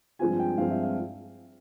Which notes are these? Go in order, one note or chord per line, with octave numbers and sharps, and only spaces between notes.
G2 F3 G#3 C4 F4 G#5
G5
G2 F3 G#3 C4 F4 F5
E5
F5